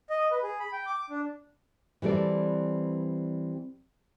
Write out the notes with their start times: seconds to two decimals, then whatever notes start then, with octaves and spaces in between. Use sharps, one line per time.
0.10 D#5
0.31 B4
0.43 G#4
0.59 B5
0.73 G5
0.86 D6
1.10 D4
2.02 E3 G3 C4 A4 D5